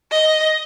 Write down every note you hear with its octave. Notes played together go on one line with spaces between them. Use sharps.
D#5